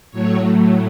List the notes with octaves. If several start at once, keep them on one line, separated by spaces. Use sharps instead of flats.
A2 F#3 A3 C#5